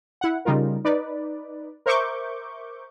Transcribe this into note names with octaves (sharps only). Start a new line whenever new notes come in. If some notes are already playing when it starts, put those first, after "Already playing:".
E4 F#5
C#3 G3 D#4 F4 A#4
D#4 B4 D5
A#4 C5 E5 C#6 D6 G6